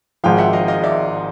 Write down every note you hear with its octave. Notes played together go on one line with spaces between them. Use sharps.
G#1 G#2 F3 F5 G5
E5 F#5
D#5 F5
D#5 F5
D5 E5